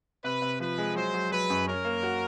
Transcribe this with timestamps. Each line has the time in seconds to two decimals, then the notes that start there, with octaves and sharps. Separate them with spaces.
0.24 C3 B4
0.42 C3
0.60 F3 B4
0.78 G#3
0.95 F#3 C5
1.14 F#3
1.32 F#3 B4
1.50 F#2
1.67 C#4 A#4
1.85 A#3
2.03 F#4